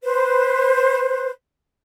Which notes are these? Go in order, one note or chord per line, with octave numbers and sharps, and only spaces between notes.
B4 C5